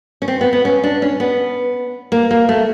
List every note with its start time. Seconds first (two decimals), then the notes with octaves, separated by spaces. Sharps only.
0.22 C#4
0.28 C4
0.41 B3
0.53 B3
0.65 C#4
0.84 D4
1.02 C#4
1.20 B3
2.12 A#3
2.31 A#3
2.49 A3